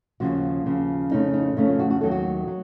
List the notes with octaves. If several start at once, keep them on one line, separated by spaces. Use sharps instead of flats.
D#2 C#3 F3 F#4
D#2 C#3 F3
F2 C#3 A3 C#4 D#4
D#4
F2 C#3 A3 C#4 D#4
F4
F#4
F#4
D#2 D#3 F#3 A3 A4
F#4
F#3